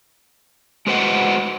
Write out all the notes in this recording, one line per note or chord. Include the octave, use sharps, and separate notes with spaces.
G#3 F#4 B4 C5 D#5 F#5